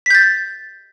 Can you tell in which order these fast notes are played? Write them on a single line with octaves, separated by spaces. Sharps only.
B6 G6 A6